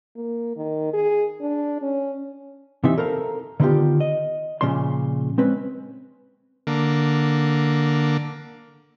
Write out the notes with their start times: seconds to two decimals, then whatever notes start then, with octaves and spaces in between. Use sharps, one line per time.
0.17 A#3
0.57 D#3
0.93 G#4
1.41 D4
1.82 C#4
2.84 C3 E3 C4 D#4 E5
2.98 A4 A#4 C5 F5 A#5
3.60 D3 D#3 B3 C#4 F4 G4
4.00 D#5
4.61 A#2 C#3 F3 D5 C6
5.38 G#3 C4 C#4 B4
6.67 D3 A#3